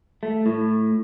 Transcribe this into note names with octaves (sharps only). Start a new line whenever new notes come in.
A3
A2